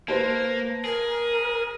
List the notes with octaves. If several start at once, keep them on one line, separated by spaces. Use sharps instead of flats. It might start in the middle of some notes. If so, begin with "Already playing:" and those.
A#3 B4 C5 A5
G#4 A#4